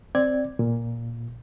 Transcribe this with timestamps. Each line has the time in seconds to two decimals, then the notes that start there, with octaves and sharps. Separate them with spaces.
0.15 C4 D5 G#6
0.59 A#2